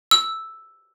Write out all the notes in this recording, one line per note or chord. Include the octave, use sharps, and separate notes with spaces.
E6